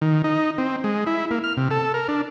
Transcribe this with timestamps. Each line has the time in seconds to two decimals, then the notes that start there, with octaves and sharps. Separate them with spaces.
0.02 D#3
0.24 D#4
0.58 C4
0.84 G#3
1.07 E4
1.31 A#3
1.44 F6
1.57 C3
1.71 A4
1.94 A#4
2.08 D4